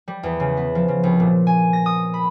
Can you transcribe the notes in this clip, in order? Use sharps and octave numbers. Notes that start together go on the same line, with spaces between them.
G3
E2
C#3
B3
F3
C#3
C2
A#2
G#5
A#6
D#6
B5